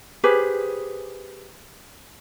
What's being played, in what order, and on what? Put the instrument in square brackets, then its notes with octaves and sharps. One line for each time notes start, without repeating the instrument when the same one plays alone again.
[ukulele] G4 G#4 B4 C5